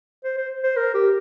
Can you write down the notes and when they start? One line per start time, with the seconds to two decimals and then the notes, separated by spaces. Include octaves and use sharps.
0.24 C5
0.37 C5
0.63 C5
0.76 A#4
0.94 G4